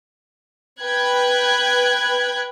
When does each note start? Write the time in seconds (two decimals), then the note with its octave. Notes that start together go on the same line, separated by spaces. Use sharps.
0.81 B4 G5 F#6 G#6